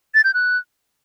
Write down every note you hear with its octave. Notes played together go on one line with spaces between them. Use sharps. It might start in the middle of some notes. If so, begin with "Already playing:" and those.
A6
G6
F#6